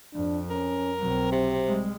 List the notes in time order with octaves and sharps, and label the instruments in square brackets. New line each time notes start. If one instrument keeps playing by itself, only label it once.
[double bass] F2 [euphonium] D4
[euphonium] C#4 [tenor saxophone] A#4
[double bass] B1 F#3 [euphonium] C4
[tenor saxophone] C3
[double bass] G3 G#3